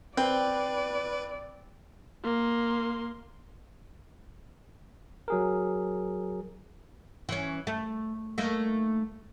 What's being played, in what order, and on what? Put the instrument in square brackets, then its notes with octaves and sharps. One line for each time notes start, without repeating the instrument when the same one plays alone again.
[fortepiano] C4 [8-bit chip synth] B4 [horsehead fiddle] D5 [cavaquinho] G5
[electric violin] A#3 C6
[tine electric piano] F#3 G#4 A#4
[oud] E3 C#4
A3
A3 A#3 D#4